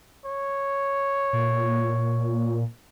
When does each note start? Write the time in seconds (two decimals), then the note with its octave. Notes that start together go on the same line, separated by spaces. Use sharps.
0.25 C#5
1.33 A#2